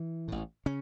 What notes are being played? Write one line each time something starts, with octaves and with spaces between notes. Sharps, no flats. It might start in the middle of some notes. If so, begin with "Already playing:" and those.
Already playing: E3
A1 A2
C#3 C#4